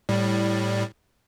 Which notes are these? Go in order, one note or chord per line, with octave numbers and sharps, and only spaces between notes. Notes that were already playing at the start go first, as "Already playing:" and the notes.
A2 G3